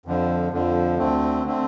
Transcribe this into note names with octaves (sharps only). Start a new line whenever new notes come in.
F2 D3 F3
F2 D3 F3
D2 D3 A3 C4
D3 A3 C4